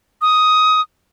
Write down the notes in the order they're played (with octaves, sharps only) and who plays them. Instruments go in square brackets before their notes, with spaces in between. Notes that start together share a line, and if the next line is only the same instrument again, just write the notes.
[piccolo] D#6